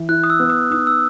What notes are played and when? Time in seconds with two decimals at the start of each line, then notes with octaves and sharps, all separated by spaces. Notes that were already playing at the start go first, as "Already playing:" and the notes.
Already playing: E3
0.09 E4 F#6
0.24 D#6
0.30 E6
0.40 B3
0.50 D#6
0.71 D#4 D#6
0.87 E6